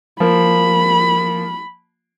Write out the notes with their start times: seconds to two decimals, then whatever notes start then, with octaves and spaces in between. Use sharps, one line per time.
0.20 F3 A#3 B5